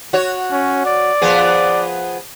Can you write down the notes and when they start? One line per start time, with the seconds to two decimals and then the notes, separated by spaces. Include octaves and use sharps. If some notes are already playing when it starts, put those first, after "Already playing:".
0.13 F#4 C#5
0.51 C#4
0.85 D5
1.22 F3 B3 G#4